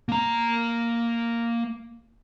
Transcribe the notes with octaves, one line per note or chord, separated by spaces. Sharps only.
A#3 A#5